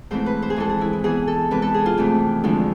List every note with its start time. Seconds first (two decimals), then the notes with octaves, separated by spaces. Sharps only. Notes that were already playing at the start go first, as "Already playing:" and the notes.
0.11 G#2 E3 A3 C4 C5
0.26 B4
0.42 C5
0.50 G#4
0.56 F2 E3 G#3 A4
0.70 G#4
0.81 E4
0.93 E4
1.04 G#2 E3 B3 G#4
1.27 A4
1.51 C3 E3 G#3 B4
1.62 A4
1.74 G#4
1.86 F4
1.97 F2 C3 E3 A3
2.44 D2 D3 F3 G#3